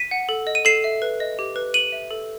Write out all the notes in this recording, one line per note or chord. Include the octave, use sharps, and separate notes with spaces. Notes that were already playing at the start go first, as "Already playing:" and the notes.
Already playing: B6 D#7
F#5
A4
D#5
D#7
A4 C7 E7
E5
B4
D#5
G4
B4
B4 D#7 F#7
E5
A4